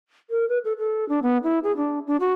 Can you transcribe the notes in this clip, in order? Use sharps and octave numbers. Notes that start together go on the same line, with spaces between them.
A#4
B4
A4
A4
D4
B3
E4
G#4
D4
D4
F#4